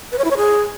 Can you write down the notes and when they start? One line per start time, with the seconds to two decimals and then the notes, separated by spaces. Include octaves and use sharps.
0.12 B4
0.18 C#5
0.25 E4
0.31 C#5
0.37 G#4